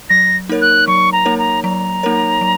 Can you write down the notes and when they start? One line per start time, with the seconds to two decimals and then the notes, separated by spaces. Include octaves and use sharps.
0.10 F#3 A#6
0.49 A#3 D#4 A#4 C#5
0.61 F#6
0.87 F#3 C#6
1.12 A#5
1.25 A#3 D#4 A#4 C#5
1.39 A#5
1.64 F#3 A#5
2.03 A#3 D#4 A#4 C#5
2.41 F#3